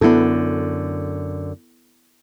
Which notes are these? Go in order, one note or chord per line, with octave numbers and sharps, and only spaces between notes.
F#2 D3 B3 E4 A4